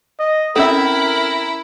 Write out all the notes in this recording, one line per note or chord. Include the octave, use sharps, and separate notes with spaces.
D#5
C4 C#4 E4 A4 A#4 E5